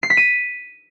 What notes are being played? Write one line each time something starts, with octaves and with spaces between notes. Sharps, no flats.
C7
B6
D#7